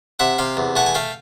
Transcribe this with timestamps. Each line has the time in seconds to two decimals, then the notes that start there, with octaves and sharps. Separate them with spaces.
0.19 C3 E5 F#5
0.38 C3 F5 G5
0.57 E2
0.76 A3 F#5 G#5
0.86 G#5
0.95 A3 F5 G5